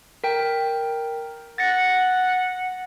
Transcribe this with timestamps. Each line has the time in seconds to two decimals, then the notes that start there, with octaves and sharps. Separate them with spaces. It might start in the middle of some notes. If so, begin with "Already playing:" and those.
0.24 A#4 G5
1.58 F#5 A6 A#6 C#7